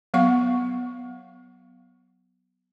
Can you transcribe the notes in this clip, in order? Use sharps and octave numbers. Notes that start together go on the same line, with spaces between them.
F#3 B3 F5 F#5 C#6